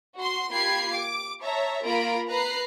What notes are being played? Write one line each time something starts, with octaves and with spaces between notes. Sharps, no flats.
F#4 C6
A#3 F4 G4 B5 G#6 C7
D6
C#5 E5 A5 A#5
A#3 F4 A#4 A#5 B5 D7
B4 A#5 F#6 C7